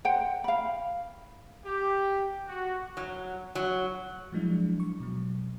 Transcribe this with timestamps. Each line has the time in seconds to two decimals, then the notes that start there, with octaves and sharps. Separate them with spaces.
0.05 C5 F#5 G5
0.44 F5 B5
1.65 G4
2.48 F#4
2.97 F#3
3.55 F#3
4.32 F3 F#3 G#3 D4 E4
4.80 C#6
5.00 B2 F#3